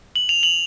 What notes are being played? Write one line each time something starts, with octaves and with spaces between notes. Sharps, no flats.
F#7
F7
F#7